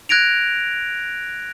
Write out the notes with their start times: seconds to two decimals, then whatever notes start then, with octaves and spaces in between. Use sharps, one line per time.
0.09 F#6 G#6 A#6 D7 F7